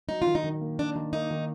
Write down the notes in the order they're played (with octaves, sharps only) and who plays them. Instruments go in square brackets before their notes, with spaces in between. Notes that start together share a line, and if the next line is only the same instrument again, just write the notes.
[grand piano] F#3 [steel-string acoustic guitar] D#4
[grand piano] D#3 [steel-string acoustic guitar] F4
[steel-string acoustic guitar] D#4
[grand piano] D#3
A#3
[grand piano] D#3 [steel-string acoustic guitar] D4
[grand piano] D#3
[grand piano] A#3 [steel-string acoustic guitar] D#4
[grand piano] D#3